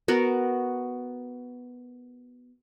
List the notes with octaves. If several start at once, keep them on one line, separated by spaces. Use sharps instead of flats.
B3 F#4 A#4